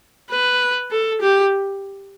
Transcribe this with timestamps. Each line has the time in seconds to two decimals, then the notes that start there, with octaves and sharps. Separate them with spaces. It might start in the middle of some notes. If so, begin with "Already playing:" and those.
0.31 B4
0.91 A4
1.21 G4